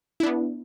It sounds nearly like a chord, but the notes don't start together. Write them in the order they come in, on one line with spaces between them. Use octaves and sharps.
E4 D4 B3